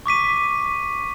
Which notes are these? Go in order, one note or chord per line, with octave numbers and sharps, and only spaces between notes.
C#6 D6 B6 D#7